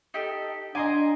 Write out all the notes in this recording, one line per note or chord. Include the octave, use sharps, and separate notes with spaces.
D#4 G4 A4
D4 D#5 G#5 A#5 C6 D6